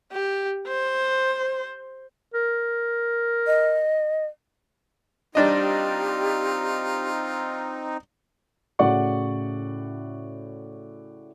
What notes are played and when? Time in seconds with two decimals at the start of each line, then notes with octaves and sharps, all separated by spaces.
0.12 G4
0.68 C5
2.34 A#4
3.47 D#5
5.35 G3 C4 D4 D#4 F4 G4 D#5
8.79 A2 C#3 F#4 D5 F#5 C#6